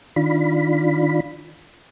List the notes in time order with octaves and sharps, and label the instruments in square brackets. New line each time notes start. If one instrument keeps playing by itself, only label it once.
[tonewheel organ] D#3 D4 F4 B5